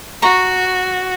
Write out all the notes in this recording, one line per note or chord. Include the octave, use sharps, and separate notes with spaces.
F#4 A#5 C#6